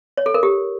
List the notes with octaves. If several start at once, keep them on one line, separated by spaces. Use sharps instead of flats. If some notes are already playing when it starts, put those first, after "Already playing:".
C#5
A4
A#4
G4